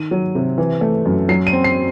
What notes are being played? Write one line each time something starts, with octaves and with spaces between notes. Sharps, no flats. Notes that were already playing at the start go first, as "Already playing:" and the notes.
Already playing: D#3 D#7
F#3
C3
E3
A3
F#2
F#3 C7
D#7
C4
C7